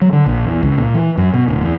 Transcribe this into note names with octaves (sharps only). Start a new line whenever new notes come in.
F#3
D3
A#1
E2
C#2
A#2
E3
F#2
B2
D1
E2